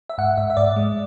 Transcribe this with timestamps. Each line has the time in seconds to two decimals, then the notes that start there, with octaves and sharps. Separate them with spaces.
0.10 E5
0.18 G#2 F#5
0.37 G#2 E5
0.50 E5
0.57 G#2 D5
0.76 G#3